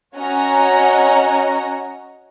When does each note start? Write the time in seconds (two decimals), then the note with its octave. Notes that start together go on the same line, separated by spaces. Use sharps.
0.16 C#4 F#4 C#5 D#5 F#5 A#5